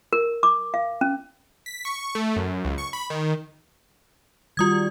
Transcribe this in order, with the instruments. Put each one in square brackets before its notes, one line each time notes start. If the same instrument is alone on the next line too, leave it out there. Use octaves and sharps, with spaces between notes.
[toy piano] A#4
D6
F5
C#4
[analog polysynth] B6
C#6
A3
F#2
C#2
C#6
B5
D#3
[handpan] D#3 G3 F#4 [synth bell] F4 D#6 G#6